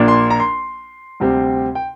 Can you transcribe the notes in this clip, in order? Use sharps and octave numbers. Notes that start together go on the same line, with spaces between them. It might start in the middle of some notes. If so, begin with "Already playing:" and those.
Already playing: A#1 A#2 A#3 D4
C6
A#5
C6
D2 C3 G3 C4
G5